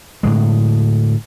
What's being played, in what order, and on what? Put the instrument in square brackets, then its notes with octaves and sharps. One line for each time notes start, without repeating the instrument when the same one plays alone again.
[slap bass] A2 D3 G#3